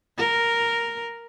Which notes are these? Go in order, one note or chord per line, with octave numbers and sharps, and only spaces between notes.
A#4